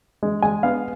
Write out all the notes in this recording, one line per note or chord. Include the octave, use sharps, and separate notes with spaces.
G#3
G#3 G#5
B3 F5